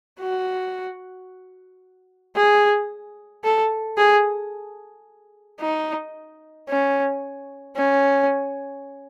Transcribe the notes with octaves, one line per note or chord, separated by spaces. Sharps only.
F#4
G#4
A4
G#4
D#4
C#4
C#4